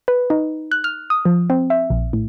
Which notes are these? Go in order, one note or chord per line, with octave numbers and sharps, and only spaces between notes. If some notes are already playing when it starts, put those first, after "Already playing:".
B4
D#4
F#6
F6
D#6
F3
C4
E5
A#1
A2